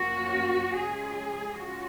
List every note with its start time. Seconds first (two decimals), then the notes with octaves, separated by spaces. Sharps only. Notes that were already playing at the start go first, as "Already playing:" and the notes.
Already playing: F#2 F3 A#3 C#4 F#4
0.74 C#3 F3 G#3 C#4 G#4
1.58 C#4 F4 F#4